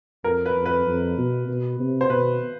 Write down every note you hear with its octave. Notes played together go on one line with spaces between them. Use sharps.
F2 A#4
B4
F2
B4
F2
B2
B2
C3
C5
B2 B4